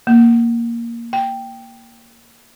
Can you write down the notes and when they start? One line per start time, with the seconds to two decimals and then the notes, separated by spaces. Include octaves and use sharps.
0.07 A#3
1.13 G5